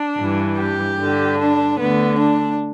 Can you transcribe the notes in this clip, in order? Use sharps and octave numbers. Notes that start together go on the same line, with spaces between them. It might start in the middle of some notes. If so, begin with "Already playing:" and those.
Already playing: D4
G2 E3
G4
G2 D3
D4
D2 D3 B3
D4